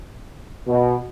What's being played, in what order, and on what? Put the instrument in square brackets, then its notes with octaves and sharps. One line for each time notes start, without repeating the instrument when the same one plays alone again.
[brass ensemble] B2